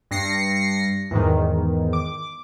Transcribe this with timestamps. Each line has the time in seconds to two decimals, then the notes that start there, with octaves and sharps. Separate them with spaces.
0.11 G2 A#6 C7 C#7
1.11 E2 G#2 D#3
1.93 D6